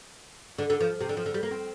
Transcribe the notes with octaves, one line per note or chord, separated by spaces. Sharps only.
D3
D3
F3
C3
D3
F3
D3
G3
A#3
C4